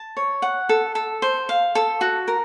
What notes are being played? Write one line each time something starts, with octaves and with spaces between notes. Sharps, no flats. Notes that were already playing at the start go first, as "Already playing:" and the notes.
Already playing: A5
C#5
F#5
A4
A4
C5
F5
A4
F#4
A#4